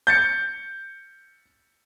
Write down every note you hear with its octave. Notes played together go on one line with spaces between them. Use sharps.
G6 A6 C#7